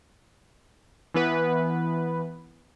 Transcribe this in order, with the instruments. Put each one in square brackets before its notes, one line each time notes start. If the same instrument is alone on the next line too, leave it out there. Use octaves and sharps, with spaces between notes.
[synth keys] E3 B3 B4